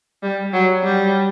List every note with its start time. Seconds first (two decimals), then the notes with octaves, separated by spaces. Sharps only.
0.23 G3
0.53 F#3
0.84 G3